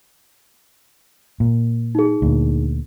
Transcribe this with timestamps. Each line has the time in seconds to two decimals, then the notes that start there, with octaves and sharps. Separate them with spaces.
1.40 A#2
1.95 D#4 G#4
2.22 D2 A#2